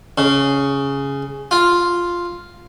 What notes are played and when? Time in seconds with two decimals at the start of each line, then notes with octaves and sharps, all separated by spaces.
0.18 C#3
1.51 F4